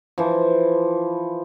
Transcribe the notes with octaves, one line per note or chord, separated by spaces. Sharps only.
E3 F3